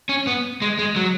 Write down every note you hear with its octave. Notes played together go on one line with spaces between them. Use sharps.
C#4
B3
G#3
G#3
F#3